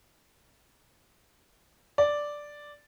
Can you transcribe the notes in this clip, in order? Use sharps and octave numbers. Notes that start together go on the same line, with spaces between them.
D5